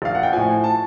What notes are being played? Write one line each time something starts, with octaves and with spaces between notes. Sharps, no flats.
A#1 F5
F#5
G5
A2 F3 G#5
A5